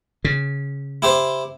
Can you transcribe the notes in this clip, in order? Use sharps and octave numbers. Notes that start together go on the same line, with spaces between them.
C#3
E4 G4 C5